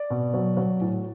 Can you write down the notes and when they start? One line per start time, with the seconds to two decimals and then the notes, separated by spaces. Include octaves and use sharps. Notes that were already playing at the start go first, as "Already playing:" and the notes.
Already playing: D5
0.10 B2
0.34 F#3
0.57 F#3
0.81 A2